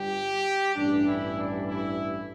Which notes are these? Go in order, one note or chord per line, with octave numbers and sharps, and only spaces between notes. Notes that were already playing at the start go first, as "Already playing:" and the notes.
Already playing: G1 G2 G3 G4
A1 G2 E3 G3 D4
E4
D4
E4